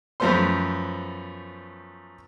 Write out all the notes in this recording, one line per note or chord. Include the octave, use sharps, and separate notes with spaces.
F#2 F3 A3 B3 C5 C6